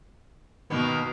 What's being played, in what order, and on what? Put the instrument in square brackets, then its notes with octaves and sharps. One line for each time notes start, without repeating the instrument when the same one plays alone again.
[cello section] B2 [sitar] D#3 A#3 B3